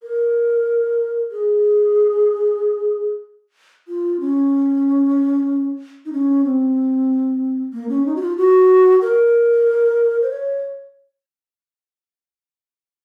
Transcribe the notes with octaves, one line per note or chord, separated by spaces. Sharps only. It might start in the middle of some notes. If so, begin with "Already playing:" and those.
A#4
G#4
F4
C#4
D#4
C#4
C4
A#3
C#4
D#4
F#4
F4
F#4
A#4
C5
C#5